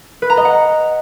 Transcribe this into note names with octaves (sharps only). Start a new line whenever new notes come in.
B4
A#5
D#5
F#5